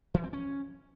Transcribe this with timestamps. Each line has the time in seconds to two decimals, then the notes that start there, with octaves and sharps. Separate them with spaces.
0.14 E3
0.24 C4
0.33 C#4